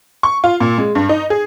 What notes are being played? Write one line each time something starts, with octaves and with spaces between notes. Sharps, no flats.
C#6
F4
A#2
G#3
G2
D#4
G#4